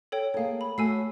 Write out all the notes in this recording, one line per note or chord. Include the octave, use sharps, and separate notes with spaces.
A4 C#5 G5
A#3 G#4 A4 C#5 F5
B5
A3 F#4 C#5 G#5 E6 C7